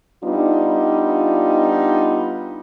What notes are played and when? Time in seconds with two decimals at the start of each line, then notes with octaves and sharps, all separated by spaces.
0.24 G3 B3 D4 D#4 F4